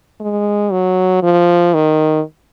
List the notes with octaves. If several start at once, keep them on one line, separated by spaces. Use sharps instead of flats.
G#3
F#3
F3
D#3